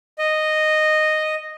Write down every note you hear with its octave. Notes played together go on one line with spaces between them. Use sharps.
D#5